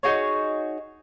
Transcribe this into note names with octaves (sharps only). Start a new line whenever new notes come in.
D#4 F#4 G#4 C#5